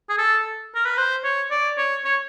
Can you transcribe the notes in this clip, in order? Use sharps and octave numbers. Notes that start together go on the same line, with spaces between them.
G#4
A4
A#4
B4
C5
C#5
D5
C#5
C#5